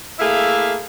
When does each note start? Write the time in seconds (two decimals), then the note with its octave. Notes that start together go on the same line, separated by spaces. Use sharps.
0.20 A3 A#3 E4 G#4 E5 F5